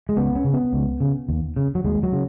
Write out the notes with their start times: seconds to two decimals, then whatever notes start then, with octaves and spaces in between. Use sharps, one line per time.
0.09 G#3
0.17 C#2 B3
0.35 C#4
0.44 C#3
0.53 B3
0.73 C#2
1.00 C#3
1.29 D#2
1.56 C#3
1.75 F#3
1.85 D#2 G#3
2.03 F#3
2.12 C#3